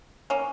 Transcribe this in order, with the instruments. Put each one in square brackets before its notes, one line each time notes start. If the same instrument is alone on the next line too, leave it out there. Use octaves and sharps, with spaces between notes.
[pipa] A#3 C#4